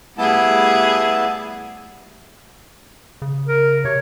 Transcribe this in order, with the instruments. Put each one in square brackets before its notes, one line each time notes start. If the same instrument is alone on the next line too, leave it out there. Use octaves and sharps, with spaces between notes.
[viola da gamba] G3 A3 G#4 [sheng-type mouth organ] B3 E4 A5
[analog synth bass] C#3
[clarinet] A#4
[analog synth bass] C3 [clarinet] C#5